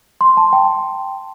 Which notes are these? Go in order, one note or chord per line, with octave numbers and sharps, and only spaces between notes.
C6
A5
G5